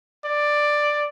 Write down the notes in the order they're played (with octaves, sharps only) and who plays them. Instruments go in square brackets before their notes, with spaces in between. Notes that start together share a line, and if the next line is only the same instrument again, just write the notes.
[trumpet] D5